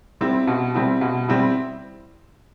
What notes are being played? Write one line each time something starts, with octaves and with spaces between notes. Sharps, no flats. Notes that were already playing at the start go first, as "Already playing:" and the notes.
G3 C4 E4
B2
G3 C4 E4
B2
G3 C4 E4